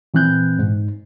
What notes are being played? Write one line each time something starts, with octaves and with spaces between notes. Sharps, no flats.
A#2 E3 C4 F#6 G6
G#2